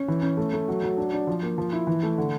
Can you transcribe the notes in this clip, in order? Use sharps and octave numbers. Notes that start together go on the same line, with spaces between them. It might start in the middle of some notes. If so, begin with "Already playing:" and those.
Already playing: C#4
E3
C#4
A3
A3
F#3
F#3
D4
D4
F3
A#3
F3
E4
E3
A3
D3